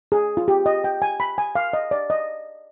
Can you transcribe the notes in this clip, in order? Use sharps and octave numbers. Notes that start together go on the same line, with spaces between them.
G#4
F4
G4
D#5
G5
G#5
B5
G#5
F5
D#5
D5
D#5